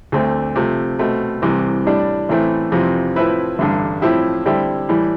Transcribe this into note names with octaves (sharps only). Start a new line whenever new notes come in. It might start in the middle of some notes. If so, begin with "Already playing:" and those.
D2 D3 A3 C4
C3 F3 A3
B2 A3 C4
C2 C3 E3
A2 G3 D4
A1 A2 E3 A3 C4
F2 C3 E3
A2 F3 C4 E4 B4
A1 G2 D3
A2 F3 C4 E4 G4
D3 G3 C4 E4 G4
A2 E3 G3